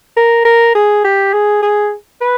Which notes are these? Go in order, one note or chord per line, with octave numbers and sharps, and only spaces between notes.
A#4
A#4
G#4
G4
G#4
G#4
B4